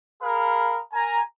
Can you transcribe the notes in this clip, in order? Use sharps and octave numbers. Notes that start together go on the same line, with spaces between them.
G#4 A#4 F5 B5
A#4 G#5 A#5